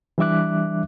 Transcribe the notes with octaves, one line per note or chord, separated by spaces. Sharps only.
E3 G3 D4 E5 D6 F#6